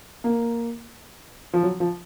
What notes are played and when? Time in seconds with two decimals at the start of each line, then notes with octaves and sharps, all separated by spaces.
0.24 A#3
1.53 F3
1.63 F#3
1.80 F3